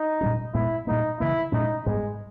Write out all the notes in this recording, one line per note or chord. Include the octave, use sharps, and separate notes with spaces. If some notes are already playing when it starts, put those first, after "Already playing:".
Already playing: D#4
A#2 G3 C#4
A#2 G#3 B3 E4
A#2 G3 A#3 D#4
C#3 E3 A#3 E4
A#2 G#3 C#4 D#4
G#2 G3 G#3 B3